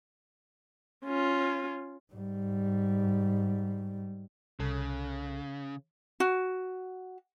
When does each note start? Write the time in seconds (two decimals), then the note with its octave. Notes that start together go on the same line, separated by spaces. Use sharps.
1.05 C#4 F4
2.13 G#2 G3
4.60 C2 C#3 A4 F#6
6.20 F#4